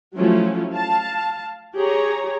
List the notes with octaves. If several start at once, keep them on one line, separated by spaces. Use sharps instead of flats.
F3 F#3 A3 C#4 E4 F4
F5 A5
G4 G#4 C#5 A#5